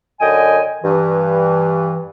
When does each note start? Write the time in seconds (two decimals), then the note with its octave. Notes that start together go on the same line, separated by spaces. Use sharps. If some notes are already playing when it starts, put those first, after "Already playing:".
0.20 F#2 D3 D#5 G5 G#5
0.84 G2 E3